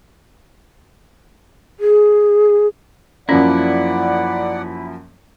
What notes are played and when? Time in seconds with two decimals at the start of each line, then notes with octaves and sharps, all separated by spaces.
1.80 G#4
3.29 F#2 F3 A#3 C#4 E4 D5 F#5